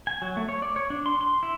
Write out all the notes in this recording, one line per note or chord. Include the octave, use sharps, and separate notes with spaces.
G#5
F#3
A3
C#5
D5
C#5
D4
C6
C6
E4